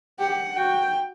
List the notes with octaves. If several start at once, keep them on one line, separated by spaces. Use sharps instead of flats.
G4 F#5
F#4 G5